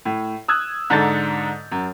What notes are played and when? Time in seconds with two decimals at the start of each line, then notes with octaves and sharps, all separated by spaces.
0.05 A2
0.48 D#6 E6 F#6 G#6
0.90 G#2 D3 A4 A#5 G6 A6
1.72 F#2